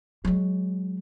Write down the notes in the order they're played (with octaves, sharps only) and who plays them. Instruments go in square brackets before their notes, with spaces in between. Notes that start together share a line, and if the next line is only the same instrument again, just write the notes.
[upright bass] F#3 G#3